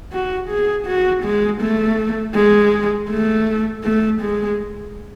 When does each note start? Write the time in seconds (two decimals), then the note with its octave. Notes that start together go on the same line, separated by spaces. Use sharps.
0.12 F#4
0.49 G#4
0.86 F#4
1.24 G#3
1.61 A3
2.35 G#3
3.10 A3
3.84 A3
4.21 G#3